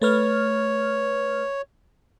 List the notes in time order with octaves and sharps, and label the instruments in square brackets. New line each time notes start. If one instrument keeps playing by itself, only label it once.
[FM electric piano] A3 B4 F6 [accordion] C#5